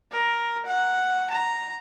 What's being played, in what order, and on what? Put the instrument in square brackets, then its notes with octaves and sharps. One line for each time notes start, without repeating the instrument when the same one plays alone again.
[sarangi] A#4
F#5
A#5